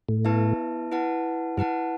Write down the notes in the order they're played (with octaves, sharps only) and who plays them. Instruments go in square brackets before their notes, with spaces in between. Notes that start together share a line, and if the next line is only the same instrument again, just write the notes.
[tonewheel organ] A2
[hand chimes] B3 E4 B4 E5 A5
E4 B4 F#5 A5
[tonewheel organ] G2 [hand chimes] E4 B4 F#5 A5